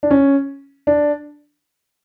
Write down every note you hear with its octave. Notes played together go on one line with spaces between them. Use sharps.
D4
C#4
D4